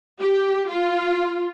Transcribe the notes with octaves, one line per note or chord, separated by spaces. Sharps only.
G4
F4